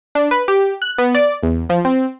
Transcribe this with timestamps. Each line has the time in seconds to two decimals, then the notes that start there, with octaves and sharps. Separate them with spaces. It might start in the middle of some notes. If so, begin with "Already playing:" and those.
0.15 D4
0.31 B4
0.48 G4
0.82 F#6
0.98 B3
1.15 D5
1.43 E2
1.70 F3
1.85 C4